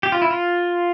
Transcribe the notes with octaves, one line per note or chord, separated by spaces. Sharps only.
G4
F4
E4
F4